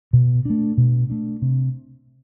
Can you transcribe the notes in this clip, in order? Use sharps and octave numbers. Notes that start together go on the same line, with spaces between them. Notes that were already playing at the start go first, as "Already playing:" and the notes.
B2
A3 D4
B2
A3 D4
C3